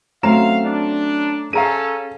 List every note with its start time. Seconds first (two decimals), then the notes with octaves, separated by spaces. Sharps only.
0.23 F#3 A3 C4 C#4 F5 A#5 E7
0.64 D4
1.53 C#4 G#4 A4 F5 A#5 D#7